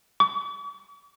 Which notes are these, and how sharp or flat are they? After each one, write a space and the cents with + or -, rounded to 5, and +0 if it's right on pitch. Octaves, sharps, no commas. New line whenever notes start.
C#6 +45